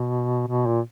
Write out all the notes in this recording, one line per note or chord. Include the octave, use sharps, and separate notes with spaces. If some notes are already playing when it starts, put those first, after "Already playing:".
Already playing: B2
B2
A#2